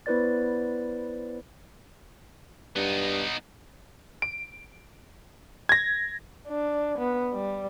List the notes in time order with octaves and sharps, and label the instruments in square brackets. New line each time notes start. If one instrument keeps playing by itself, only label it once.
[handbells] B3 E4 B4 C5 D5 A6
[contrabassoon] G2 [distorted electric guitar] B3 D#4
[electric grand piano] D7
G#6 A#6
[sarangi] D4
B3
G3